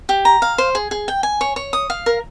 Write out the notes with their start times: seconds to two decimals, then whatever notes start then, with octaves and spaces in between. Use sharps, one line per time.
0.09 G4
0.25 A#5
0.42 F5
0.58 C5
0.75 G#4
0.91 G#4
1.08 G5
1.23 G#5
1.41 C#5
1.56 C#5
1.73 D#6
1.90 F5
2.06 A#4